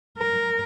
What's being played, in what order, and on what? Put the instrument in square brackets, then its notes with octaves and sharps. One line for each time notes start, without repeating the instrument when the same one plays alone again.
[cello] A#4